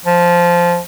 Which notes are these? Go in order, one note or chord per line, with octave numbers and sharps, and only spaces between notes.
F3